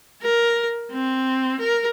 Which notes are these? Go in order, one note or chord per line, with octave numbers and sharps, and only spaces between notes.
A#4
C4
A#4